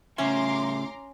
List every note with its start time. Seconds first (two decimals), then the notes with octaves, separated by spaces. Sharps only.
0.18 A2 C#3 C#4 E5 A#5 C6 D6